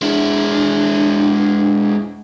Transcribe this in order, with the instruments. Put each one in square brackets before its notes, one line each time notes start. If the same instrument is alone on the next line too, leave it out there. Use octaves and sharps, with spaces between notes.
[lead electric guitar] G#3 E4 [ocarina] D4